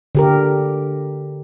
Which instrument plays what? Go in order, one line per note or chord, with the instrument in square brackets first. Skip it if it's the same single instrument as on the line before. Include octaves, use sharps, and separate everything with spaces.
[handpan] D3 G4 A#4